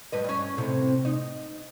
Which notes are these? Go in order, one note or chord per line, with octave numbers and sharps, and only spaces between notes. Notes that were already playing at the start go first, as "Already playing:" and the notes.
G2 B4 D#5
G2 C#4
A2 C3
D#4